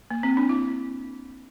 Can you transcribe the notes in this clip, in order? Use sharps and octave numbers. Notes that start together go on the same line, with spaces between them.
A#3
C4
D4
E4